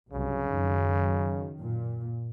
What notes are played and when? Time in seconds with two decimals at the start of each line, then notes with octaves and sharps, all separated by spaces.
0.12 C2 G2 C#3 F#3
0.48 F#2 D#3
1.60 A#2